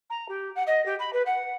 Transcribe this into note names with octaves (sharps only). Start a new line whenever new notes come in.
A#5
G4
F#5
D#5
G4
B5
B4
F#5